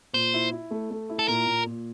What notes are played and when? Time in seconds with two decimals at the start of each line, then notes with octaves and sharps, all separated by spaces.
0.14 A#2 C5
0.34 E4
0.52 E4
0.71 A3
0.90 A3
1.09 E4
1.19 A4
1.28 A#2 A#4
1.47 A#2
1.66 A#2